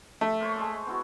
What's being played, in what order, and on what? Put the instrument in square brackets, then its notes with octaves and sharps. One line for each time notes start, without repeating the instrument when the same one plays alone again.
[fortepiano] A3
[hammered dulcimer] A#3 C5 C#5
G#3 D#5 A5
B3 E4 F#4